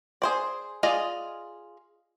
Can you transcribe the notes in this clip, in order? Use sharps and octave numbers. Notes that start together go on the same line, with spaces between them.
G#4 C5 D5
F4 G#4 D5 D#5